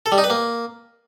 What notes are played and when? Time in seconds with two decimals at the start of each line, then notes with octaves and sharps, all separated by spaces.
0.06 A4
0.12 G3
0.18 D#4
0.24 B4
0.30 A#3